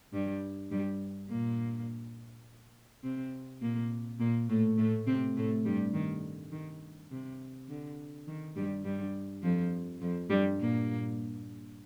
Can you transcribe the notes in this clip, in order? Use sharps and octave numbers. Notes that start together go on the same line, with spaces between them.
G2 G3
G2 G3
A#2 A#3
C3 C4
A#2 A#3
A#2 A#3
A2 A3
A2 A3
C3 C4
A2 A3
G2 G3
D#3
D#3
C3
D3
D#3
G2 G3
G2 G3
F2 F3
F2 F3
G2 G3
A#2 A#3